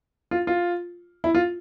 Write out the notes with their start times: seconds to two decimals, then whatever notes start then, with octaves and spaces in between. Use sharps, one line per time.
0.31 F4
0.47 F4
1.24 E4
1.35 F4